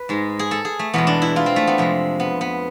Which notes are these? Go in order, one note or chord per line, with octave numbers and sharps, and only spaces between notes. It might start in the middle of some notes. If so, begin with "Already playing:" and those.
Already playing: B4
G#2 G#3
G#4
A4
G#4
A3
E2 B2 G#3 B3
D4
E4
F4
C4
A3
B3
F2 C3 G#3
B3
B3